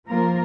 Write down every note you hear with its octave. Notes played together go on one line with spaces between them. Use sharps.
F3 A#3 F4 A#4